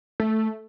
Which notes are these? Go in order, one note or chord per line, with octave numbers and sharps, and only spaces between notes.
A3